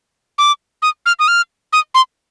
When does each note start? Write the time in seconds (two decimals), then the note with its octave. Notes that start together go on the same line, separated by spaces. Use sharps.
0.38 D6
0.82 D#6
1.06 F6
1.19 D#6
1.28 F6
1.73 D#6
1.95 C6